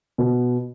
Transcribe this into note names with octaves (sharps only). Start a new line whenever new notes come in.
B2